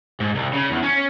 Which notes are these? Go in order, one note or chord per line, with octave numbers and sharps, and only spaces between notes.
G#2
C2
C#3
E2
C#4